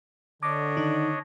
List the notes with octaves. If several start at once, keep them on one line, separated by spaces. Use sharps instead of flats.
D3 D4 C#5 D#5 D6
D#3 D#4